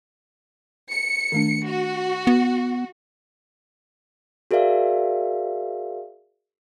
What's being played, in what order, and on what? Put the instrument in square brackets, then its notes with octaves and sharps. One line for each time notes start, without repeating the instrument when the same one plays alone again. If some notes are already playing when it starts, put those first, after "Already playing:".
[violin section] C#7
[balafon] D#3 A3 D4
[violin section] F#4
[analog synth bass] B3
[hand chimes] F#4 G#4 A#4 D5 E5 F5